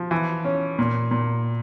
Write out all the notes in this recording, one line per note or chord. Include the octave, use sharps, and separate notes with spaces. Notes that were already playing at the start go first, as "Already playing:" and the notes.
Already playing: F3
E3
C#4
A#2
A#2